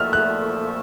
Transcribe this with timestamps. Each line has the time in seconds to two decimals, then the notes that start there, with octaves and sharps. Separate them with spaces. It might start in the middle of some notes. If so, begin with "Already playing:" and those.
Already playing: A#2 F3 A3 F6
0.13 F#6